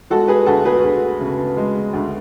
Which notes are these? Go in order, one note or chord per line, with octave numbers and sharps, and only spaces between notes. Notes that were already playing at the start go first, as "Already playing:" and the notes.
G#3 F#4 A4
G#4 B4
D2 F#4 A4
G#4 B4
D2
C#3
G#3
D2